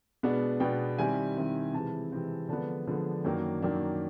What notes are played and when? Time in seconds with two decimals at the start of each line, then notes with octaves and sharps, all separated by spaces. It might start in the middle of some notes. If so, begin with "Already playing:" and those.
0.23 B2 G#3 B3 D4 F#5
0.60 B2 G#3 B3 D4 G5
0.98 D#3 G3 C4 E4 G#5
1.36 D#3 G3 C4 E4
1.73 C3 E3 G#3 C4 A5
2.12 C3 E3 G#3 C4
2.49 D3 F3 G#3 B3 D4 A5
2.87 D3 F3 G#3 B3 D4
3.24 F#2 D#3 F#3 A#3 D4 G5
3.62 F#2 D#3 F#3 A#3 D4